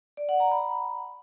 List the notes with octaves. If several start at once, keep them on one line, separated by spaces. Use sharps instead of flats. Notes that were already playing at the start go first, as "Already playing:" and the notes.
D5
F#5
A#5
B5